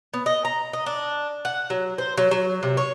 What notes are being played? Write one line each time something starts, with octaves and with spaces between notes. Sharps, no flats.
B3
D#5
A#5
D#5
D4
F#5
F#3
C5
F#3
F#3
C3
C#5